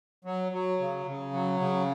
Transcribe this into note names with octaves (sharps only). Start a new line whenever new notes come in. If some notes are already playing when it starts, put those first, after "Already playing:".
F#3
F#3
C#3
C#3
F#3
C#3